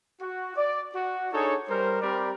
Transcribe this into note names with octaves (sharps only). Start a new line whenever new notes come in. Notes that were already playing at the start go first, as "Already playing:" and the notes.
F#4
D5
F#4
D4 D#4 G#4 A4 C#5
G3 A#4 C5
G3 C4 G4 A#4 D5 B5